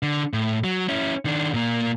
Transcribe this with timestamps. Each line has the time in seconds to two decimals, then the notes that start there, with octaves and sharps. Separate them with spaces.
0.03 D3
0.33 A2
0.64 F#3
0.88 C#4 E4
1.25 D#3 D4
1.54 A#2 A#3